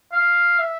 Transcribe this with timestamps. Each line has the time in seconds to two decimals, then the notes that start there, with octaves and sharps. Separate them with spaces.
0.12 F5
0.59 E5